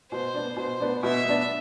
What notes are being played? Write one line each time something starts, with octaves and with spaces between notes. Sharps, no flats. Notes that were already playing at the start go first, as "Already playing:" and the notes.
B2 C5
B3 D4
B2 C5
B3 D4
B2 E5
B3 D4